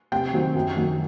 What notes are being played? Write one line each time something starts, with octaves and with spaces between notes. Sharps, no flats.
C3 G5
D#3 F#3 C4
F#2
D#3 F#3